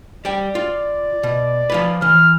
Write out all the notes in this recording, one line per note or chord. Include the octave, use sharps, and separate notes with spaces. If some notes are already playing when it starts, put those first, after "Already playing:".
G3 D5 G5
F4
B2
F3 F4 B4
E3 F6